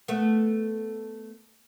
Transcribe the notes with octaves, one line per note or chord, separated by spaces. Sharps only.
A3 B3